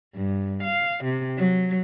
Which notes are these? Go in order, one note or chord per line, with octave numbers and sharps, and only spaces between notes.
G2
F5
C3
F#3